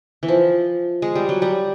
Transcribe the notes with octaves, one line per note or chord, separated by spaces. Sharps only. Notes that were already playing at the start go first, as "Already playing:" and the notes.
E3
F3
G#3
G3
F#3
G3